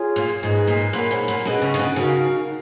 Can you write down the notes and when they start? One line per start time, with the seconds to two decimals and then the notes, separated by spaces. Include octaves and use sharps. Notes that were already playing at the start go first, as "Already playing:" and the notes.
Already playing: F4 G#4 C#5 G#5
0.16 A#2
0.43 G#2 G#4 B4 D#5
0.67 A#2
0.93 A#2 A#4 C#5 F#5 B5
1.11 G#2
1.28 A#2
1.45 B2 C#4 G#4 B4 D#5
1.62 C#3
1.74 C#3
1.79 B2
1.96 C#3 D#4 F#4 A#4 F5